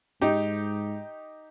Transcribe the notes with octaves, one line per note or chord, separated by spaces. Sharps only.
G#2 D#4 G4